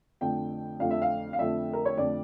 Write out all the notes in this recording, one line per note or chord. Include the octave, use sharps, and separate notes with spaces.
F2 D3 F3 A3 G5
F2 D3 F3 A3 F5
E5
F5
F5
F2 D3 F3 A3 E5
A#4
C#5
F2 D3 F3 A3 D5